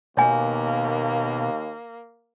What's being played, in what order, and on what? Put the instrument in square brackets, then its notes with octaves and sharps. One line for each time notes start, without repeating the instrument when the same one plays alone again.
[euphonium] D#2 [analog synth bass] B2 [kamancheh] A#3 [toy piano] C#5 G#5